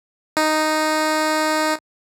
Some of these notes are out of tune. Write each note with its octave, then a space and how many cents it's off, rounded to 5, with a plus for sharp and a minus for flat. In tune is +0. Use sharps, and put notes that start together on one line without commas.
D#4 -5